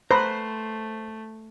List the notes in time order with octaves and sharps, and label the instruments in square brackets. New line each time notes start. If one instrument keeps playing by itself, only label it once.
[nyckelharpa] A3 [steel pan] B4 [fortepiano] C5 [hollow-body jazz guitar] A#5